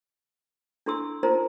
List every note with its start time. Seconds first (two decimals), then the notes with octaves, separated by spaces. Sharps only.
0.86 D4 E4 A4 G#5 C6 E6
1.23 D#4 F4 A#4 C5 G#5 A#5